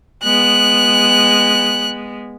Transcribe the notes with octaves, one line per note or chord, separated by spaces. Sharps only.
G#3 B3 F#6